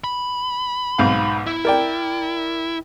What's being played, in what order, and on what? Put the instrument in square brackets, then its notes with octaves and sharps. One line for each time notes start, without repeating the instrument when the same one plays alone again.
[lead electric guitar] B5
[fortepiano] B1 G#2 F5
[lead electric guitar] E4
[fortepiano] A#4 D5 G5